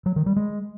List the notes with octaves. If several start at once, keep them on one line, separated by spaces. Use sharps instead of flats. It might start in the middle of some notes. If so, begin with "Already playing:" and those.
F#3
D#3
G3
G#3